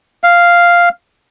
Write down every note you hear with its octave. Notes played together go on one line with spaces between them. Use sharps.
F5